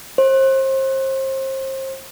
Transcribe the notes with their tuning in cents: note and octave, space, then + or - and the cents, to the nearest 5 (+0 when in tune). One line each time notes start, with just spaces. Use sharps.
C5 +35